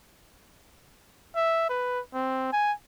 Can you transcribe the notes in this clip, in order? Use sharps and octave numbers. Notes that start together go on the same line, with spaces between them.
E5
B4
C4
G#5